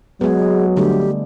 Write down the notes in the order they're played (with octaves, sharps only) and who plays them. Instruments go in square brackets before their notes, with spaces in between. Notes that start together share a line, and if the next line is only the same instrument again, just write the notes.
[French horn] F#3 [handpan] G#3 B3 [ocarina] G#4
[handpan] D3 G3 A3 [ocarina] G4